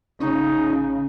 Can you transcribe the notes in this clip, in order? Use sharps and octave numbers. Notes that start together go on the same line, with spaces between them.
A1 C#3 C#4 D#4